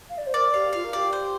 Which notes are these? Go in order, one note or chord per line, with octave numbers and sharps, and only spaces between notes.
F5
D5
C5
A#4 D5
G4 F5
F4 F5
A#4
G4 D5
C5